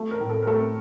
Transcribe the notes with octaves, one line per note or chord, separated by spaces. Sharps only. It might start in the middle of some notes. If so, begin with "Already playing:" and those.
Already playing: A3 A4
A#4
A2
A4
A#4
A3 A4